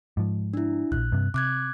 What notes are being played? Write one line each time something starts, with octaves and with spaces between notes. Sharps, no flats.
G#2 F3
D4 E4
D#1 A#1 F#6
G2 C3
C3 D6 F#6 G#6